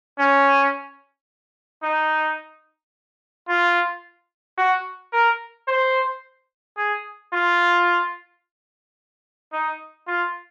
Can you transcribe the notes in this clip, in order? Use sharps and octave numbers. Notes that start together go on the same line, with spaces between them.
C#4
D#4
F4
F#4
A#4
C5
G#4
F4
D#4
F4